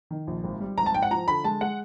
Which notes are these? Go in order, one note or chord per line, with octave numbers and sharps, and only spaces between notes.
D#3
A#1
G#1
G3
G#1 A#5
A5
G#2 G5
F#5
F3 A#5
D3 B5
G#3 A5
G#3 F#5